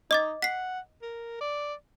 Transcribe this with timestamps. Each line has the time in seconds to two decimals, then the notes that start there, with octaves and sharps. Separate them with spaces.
0.11 D#4 D#5 D6 A6
0.42 F#5 B6 C7
1.02 A#4
1.41 D5